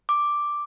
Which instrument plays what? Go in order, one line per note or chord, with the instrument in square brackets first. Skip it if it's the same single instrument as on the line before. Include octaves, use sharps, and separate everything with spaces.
[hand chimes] D6